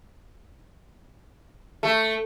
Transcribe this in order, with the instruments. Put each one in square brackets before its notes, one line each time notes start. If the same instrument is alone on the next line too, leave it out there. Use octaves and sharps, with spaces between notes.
[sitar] A3